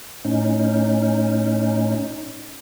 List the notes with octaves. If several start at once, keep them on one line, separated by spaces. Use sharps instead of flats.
A2 C#4 D#4